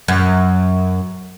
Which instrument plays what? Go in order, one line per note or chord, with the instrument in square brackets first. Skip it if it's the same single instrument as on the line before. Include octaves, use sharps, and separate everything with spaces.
[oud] F#2